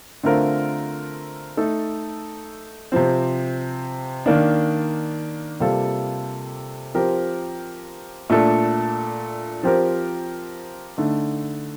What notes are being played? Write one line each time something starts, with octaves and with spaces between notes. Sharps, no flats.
D3 A3 C4 F4 A#4
A3 D#4 A4
C3 F3 C4
D#3 A#3 D4
C3 G3 A#3 F4 A4
F3 C4 G4 A#4
A#2 A3 D4 A4
F3 C4 G4 A#4
D3 A3 D#4